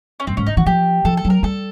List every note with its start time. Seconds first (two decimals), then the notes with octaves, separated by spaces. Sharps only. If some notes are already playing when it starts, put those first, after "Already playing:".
0.20 C#4
0.27 G2 C4
0.37 G#2 C#4
0.47 D3 D#4
0.57 E3 F#4
0.66 F3 G4
1.05 F3 A4
1.17 A4
1.25 F#3
1.30 A#4
1.43 G3 A4